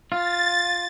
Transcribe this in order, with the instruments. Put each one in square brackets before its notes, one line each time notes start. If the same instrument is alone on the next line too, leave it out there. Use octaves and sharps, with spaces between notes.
[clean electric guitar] F4 [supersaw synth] A6